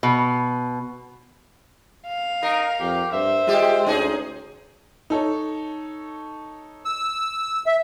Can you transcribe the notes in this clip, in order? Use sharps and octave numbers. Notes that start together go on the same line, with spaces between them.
B2
F5
D#4 A#4
F2 G4
G2 C5 E5
G#3 F4 G4
D2 C#4 D#4 G#4
D#4 A4 C#5
E6
E5